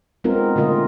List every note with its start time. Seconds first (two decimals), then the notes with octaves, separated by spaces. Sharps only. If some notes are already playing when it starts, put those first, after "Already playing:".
0.24 G#3 B3 C4 D#4 F4 A#4
0.56 A#2 D3 A3 F4 A#4 D#5